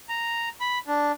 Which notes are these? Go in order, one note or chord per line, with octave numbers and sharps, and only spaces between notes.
A#5
B5
D4